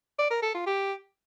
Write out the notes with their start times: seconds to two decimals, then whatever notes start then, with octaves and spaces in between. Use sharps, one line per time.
0.19 D5
0.31 A#4
0.43 A4
0.55 F4
0.67 G4